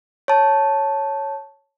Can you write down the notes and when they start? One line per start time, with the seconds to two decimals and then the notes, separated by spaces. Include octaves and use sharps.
0.28 C#5 A5